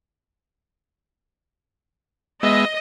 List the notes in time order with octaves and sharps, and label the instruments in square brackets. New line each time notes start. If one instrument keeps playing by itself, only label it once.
[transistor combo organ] G#3 B3 E5 [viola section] D#5